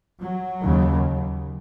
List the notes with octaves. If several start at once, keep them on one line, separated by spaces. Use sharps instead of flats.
F#3
D#2 C#3